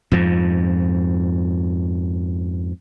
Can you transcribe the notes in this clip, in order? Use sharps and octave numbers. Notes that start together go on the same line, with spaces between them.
F2 G#2 F3